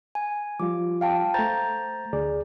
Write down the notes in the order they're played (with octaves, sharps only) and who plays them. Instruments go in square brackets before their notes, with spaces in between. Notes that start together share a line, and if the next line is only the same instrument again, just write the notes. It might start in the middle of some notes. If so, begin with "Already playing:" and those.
[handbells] G#5
[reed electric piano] F3 G3 F4 [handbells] D6
[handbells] F5 G5 A5
[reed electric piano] A3 C5 [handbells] A#5 G6 A6
[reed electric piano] D2 G#4 D5